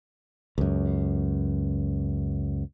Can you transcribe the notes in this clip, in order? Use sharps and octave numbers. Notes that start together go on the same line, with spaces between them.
C#2 F#2